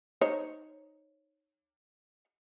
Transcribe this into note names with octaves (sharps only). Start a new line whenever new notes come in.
D#4 C5 C#5